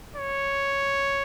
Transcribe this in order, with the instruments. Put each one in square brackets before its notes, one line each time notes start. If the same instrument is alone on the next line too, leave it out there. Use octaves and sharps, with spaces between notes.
[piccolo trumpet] C#5